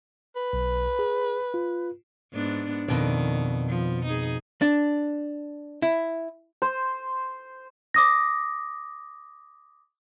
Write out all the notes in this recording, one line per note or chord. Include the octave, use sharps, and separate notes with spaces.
B4
B1
G#4
F4
G#2 B3 D4
F2 B2 D#3 D5
F3
D#4 G#4
D4
E4
C5
D6 D#6 A#6